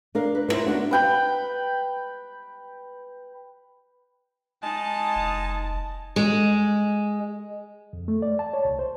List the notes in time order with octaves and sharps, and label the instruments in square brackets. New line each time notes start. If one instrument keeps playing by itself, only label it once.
[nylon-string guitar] D4 A#4 F5
B4
B3 D#4 E4 A#4 C5
B3 D4 F#4
[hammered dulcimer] B4 G5 B5
[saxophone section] G#3 D#4 [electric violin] A5
[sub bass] F1
[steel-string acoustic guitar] G#3
[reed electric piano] F2
A3
D5
A5
C#5
C2
C5